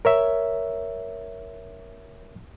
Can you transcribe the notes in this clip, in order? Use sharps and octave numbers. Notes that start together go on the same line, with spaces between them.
A#4 C#5 E5